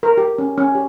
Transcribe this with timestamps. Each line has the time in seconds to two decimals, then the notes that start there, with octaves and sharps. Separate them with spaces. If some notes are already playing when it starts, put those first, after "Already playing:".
0.03 A#4
0.17 G4
0.38 C#4
0.58 C#4
0.75 G4